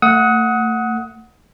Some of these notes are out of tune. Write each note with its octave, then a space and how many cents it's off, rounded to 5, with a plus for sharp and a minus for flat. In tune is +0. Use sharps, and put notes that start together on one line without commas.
A3 +35 F#5 -5 D#6 +30